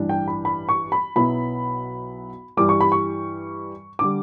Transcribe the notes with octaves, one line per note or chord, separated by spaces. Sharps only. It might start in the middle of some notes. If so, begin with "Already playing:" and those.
Already playing: A1 G2 E3 G3 D4
G5
B5
B5
C#6
B5
B1 B2 F#3 B3 E4 B5
G2 E3 G3 D6
C#6
B5
C#6
D3 G3 D6